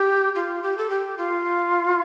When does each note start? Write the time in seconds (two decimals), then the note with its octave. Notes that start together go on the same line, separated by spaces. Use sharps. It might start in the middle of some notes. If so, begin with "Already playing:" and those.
Already playing: G4
0.35 F4
0.63 G4
0.78 A4
0.90 G4
1.18 F4